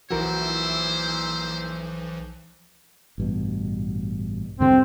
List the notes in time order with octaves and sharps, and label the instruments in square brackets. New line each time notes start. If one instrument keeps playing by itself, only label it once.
[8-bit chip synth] B1 E3 F3 [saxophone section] A#2 E4 [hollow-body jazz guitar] F#4 A#4 [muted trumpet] C5
[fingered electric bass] A1 G2 B2
[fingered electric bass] G2 D3 G3 [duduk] C4